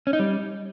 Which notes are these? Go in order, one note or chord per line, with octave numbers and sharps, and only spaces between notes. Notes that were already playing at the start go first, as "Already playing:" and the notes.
C#4
D#4
G3